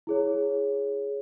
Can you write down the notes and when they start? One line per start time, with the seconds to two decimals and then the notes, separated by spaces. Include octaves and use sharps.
0.07 E4 G#4 C#5